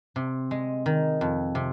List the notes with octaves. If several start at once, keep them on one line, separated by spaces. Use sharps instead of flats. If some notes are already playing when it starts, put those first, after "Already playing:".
C3
G#3
D#3
F2
C3